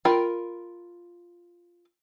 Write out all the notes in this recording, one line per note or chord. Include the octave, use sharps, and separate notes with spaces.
F4 A#4 G5 B5